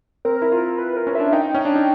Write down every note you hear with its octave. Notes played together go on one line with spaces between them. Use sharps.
C4 A#4
E4
F4
B4
A#4
C#4
D4 E5
D#4 G5
C#4
D4
D#4